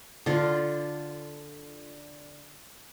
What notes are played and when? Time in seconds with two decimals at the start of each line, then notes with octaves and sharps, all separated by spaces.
0.26 D3 F4